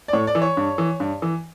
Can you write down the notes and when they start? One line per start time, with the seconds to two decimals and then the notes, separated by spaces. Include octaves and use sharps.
0.08 D5
0.13 A2 C#5
0.27 D5
0.35 E3
0.42 C#5
0.57 G2
0.78 E3
1.00 G2
1.22 E3